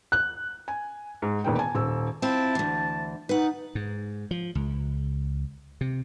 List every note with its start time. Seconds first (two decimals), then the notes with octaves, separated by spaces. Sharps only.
0.12 F#6
0.68 G#5
1.22 G#2
1.44 E1 A#2 D#3 B3 B4 G5
1.59 G#5 A5
1.75 D#1 E6
2.22 C4 E4 F4 A5
2.55 D2 E3
3.29 D#4 B4 F#5
3.75 G#2
4.31 F3
4.55 C#2
5.81 C3